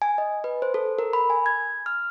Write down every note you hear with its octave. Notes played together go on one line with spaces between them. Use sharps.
G#5
D#5
B4
C5
A4
A#4
B5
G#5
G#6
F6